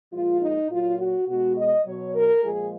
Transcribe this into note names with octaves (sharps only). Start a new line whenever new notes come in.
A#2 F3 G#3 F4
D#4
A#2 F#3 F4
F#4
B2 G#3 F#4
D#5
B2 F#3 C#5
A#4
A#2 F3 G#3 G#4